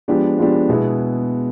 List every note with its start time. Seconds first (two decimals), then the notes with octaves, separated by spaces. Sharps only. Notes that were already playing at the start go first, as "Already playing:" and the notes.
0.08 F3 G#3 B3 D4 G4
0.38 F3 G#3 B3 D4 G4
0.69 B2 G#3 B3 E4 G#4